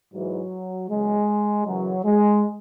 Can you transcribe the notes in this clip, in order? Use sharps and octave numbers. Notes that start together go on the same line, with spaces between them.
G#2 E3 F#3
E2 C#3 F#3 G#3
F#2 C#3 E3 F#3
G#3